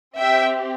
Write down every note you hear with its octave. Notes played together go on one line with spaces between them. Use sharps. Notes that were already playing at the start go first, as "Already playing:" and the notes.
C4 G4 E5 G5